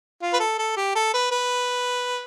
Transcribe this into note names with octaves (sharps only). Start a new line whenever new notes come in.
F4
B4
A4
A4
G4
A4
B4
B4